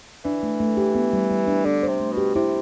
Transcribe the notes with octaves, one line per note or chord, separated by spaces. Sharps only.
E3 D4
A3
A3
G4
B3
G3
G3
D4
D3 D4
C5
C3
A3
B2
G4
C3 E4